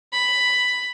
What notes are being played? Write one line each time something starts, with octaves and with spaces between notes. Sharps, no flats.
B5